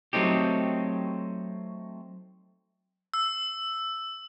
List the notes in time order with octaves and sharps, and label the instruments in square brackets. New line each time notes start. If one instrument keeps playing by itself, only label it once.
[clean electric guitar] F#3 A3 C4 D#4 G4
[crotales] E6